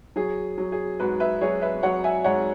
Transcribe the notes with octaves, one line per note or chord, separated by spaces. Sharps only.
F#3 G#4
F#3
G#4
G#2 F#4 B4
B4 E5
F#3 G#4 C#5
B4 E5
F#3 C#5 F#5
E5 G#5
G#2 C#5 F#5